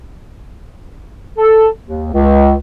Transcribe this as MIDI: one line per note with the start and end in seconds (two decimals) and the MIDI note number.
1.38 1.67 69
1.84 2.08 39
2.12 2.54 37